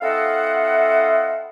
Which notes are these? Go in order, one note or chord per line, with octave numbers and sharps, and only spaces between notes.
C4 E4 A4 D#5 F5 F#5